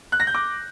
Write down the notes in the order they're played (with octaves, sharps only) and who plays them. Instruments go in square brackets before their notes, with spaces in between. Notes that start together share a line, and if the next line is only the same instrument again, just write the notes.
[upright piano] F#6
A#6
G6
D6